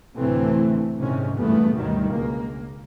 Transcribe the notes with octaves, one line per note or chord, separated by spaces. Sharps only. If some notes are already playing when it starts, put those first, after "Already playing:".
D2 A2 C3 E3 A3 C4
A#1 G#2 C3 D#3 C#4
F#1 E2 G2 A#2 A3 B3
D2 G2 B2 D#3 F#3 G3
C#2 A#3